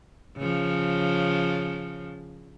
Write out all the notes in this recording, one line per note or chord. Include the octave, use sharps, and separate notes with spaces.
C#3 F3